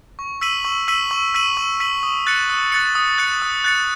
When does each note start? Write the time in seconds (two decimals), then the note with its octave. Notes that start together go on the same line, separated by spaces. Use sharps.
0.19 C#6
0.41 E6 B6 D#7 F#7
0.65 C#6
0.88 E6 B6 D#7 F#7
1.11 C#6
1.34 E6 B6 D#7 F#7
1.57 C#6
1.80 E6 B6 D#7 F#7
2.03 D#6
2.26 F#6 A6 C#7
2.50 D#6
2.72 F#6 A6 C#7
2.95 D#6
3.18 F#6 A6 C#7
3.42 D#6
3.64 F#6 A6 C#7